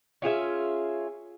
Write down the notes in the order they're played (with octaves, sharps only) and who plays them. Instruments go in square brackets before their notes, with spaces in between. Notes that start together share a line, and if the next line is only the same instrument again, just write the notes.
[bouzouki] C#4 F4 G#4 E5